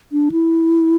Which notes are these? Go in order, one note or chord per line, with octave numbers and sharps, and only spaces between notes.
D4
E4